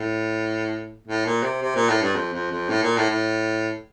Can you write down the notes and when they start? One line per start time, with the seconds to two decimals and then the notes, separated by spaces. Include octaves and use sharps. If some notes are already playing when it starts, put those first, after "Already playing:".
Already playing: A2
1.08 A2
1.26 A#2
1.43 C3
1.62 C3
1.75 A#2
1.89 A2
2.02 G2
2.16 F2
2.33 F2
2.51 F2
2.69 A2
2.83 A#2
2.97 A2
3.10 A2